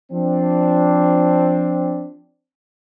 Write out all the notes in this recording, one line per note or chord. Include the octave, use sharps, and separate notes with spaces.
F3 C4 D4